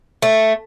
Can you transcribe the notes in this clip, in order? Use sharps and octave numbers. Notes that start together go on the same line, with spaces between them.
A3